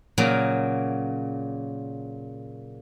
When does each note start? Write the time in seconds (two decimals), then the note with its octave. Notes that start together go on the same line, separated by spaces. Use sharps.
0.18 A#2 C#3 F#3 A#3